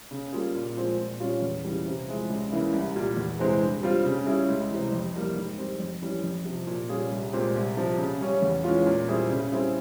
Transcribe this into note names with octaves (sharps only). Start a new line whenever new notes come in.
C#3
G3 A#3 F4 G#4
A#2
F3 G#3 C4 F4
A#2
G3 C#4 F4
E2
C#3 E3 G3
C3
F3 G#3 E4
C#2
C#3 E3 A#3 E4
C2
A#2 G3
E2
C3 E3 G#3 C4
G2
G3 C4 F4
C#3
G3 C#4 E4 G#4
C#2
C3 E3
F2
E3 G3 A#3
G#2
G3 C4
F2
E3 G3 C#4
F2
C3 F3
A#2
G3 C#4 F4 G#4
C2
A#2 G#3 C4 G4
C2
C3 F3
C#3
G3 C#4
E2
E3 G#3 C#4 F4
A#2
G3 C4 E4 G#4
C#3
G3 C4 E4 G#4